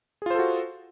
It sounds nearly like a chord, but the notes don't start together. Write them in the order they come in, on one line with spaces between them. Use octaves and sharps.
G#4 F4 C5 A4 F#4